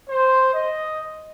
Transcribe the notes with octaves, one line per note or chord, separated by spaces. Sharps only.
C5
D#5